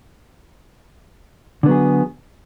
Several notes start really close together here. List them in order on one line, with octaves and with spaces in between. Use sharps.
D3 B3 F#3 G#4